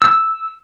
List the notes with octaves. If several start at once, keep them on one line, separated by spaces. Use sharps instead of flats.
E6